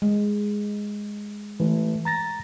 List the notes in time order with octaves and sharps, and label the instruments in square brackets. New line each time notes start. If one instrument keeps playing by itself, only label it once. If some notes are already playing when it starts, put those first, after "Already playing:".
[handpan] G#3
[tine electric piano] E3 A3
A#5 A6 A#6